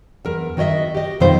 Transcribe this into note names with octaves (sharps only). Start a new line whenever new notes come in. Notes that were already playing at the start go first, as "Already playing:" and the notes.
E2 A#4
D#3 F#4 C#5 D#5 E5
G4 D#5
F2 B2 D#3 B3 F4 C5